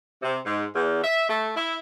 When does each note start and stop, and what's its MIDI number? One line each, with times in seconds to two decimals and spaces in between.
0.23 0.38 48
0.46 0.64 44
0.75 1.02 40
1.04 1.26 76
1.29 1.51 57
1.56 1.78 64